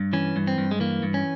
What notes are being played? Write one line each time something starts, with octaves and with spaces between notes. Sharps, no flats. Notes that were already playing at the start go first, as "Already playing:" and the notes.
Already playing: G2
E3 C#4
G2
C4
G2
G#3
E3 A#3
G2
C#4